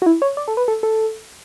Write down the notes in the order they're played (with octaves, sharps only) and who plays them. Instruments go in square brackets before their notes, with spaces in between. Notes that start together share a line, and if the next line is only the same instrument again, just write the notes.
[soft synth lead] F#4
E4
C#5
D5
A4
B4
A4
A4